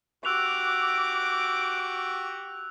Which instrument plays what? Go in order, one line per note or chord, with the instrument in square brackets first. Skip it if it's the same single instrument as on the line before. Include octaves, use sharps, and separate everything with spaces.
[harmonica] F#4 G4 [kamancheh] D6 [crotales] E6 F#6 F7